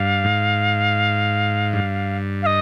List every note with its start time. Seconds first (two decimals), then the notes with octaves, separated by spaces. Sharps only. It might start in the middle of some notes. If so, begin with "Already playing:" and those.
Already playing: G2 F5
0.24 G#2
1.73 G2
2.43 F5
2.46 D#5